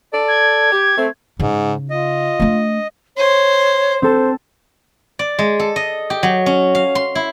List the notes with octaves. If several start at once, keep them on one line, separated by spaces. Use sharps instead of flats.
A4 D5
G#6
G4
A3 C4
G#2 C#3 D#4
F4 D#5
A3 D4
C5 C#5
C4 A4 C5
D5
G#3
A4
D#5
G4
F#3
C#4
F5
C6
E4